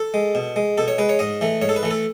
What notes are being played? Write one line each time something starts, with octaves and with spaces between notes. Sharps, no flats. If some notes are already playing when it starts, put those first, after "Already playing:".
Already playing: A4
G#3
B2
G#3
B2 A4
C#5
G#3 B4
C#5
G#2 D#5
E3 A3
G#2 C#5
A4
B4
E3 A3
A4